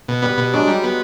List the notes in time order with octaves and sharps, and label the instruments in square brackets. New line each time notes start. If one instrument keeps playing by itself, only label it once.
[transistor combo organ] B2
[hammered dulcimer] G3 [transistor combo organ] B3
[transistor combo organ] B2
[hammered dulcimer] F#3 G#3 [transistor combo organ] D4
[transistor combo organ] G3
B3